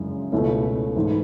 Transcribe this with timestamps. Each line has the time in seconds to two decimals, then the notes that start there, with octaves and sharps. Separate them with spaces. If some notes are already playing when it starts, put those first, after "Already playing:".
Already playing: F#2 C#3 G#3 C#4 E4
0.32 C#2 B2 A3 C#4 E4
0.96 G#2 E3 A3